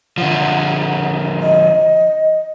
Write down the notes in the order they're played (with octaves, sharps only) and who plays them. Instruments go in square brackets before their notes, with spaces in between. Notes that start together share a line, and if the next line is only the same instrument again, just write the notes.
[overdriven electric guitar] D3 F3 [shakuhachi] F#5
[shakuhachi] D#5